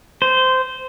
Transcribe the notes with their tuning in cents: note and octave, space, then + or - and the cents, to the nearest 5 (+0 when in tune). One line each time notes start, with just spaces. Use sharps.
C5 -15